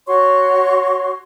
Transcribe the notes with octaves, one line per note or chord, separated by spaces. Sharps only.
F#4 C#5 C6 C#6